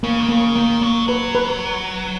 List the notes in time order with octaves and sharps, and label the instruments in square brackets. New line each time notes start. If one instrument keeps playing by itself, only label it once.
[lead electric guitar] C#3 [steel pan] A#3
[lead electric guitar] D#3
[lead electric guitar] C#3 [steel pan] A#3
[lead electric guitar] D#3 [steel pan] A#3
[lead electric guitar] F#3 [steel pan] A#3
[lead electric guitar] F#3 [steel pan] B4
[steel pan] B4